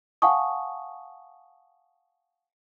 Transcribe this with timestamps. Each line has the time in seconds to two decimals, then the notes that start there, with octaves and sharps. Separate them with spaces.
0.22 F5 F#5 G#5 A5 C#6 D#6